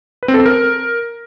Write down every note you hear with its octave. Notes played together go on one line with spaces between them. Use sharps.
B4
C4
A4
C4
A#4